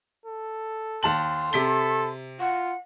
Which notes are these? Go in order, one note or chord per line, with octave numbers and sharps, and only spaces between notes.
A4
D#2 A5 C6 F#7
C3 A4 B6 G7
F4 F#5